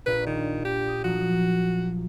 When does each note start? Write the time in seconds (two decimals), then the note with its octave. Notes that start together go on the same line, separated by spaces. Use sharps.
0.06 A#1 D4 F4 B4
0.26 D#3
0.65 G4
0.85 D#6 D7
1.04 F3 F#3 F#4